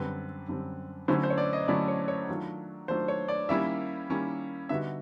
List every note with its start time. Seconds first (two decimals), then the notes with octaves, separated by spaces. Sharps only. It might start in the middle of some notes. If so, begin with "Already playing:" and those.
Already playing: F#2 D3 G3 C4 B4
0.48 F#2 D3 G3 C4
1.08 D3 F#3 A3 C#4 E4 C5
1.23 C5
1.30 C#5
1.38 D5
1.53 D#5
1.68 D3 F#3 A3 C#4 E4 D5
1.88 C#5
2.08 C#5
2.29 D#3 F#3 A3 D4 F4
2.88 D#3 F#3 A3 D4 F4 C5
3.08 C#5
3.28 D5
3.49 D#3 G3 A#3 C#4 E4 E5
4.09 D#3 G3 A#3 C#4 E4
4.69 D3 G3 B3 D#4 F#4 E5